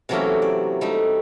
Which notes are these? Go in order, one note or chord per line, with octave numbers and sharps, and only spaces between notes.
C3 E3 F#3 A3 A#3 C#4
D5
G3 A3 D#4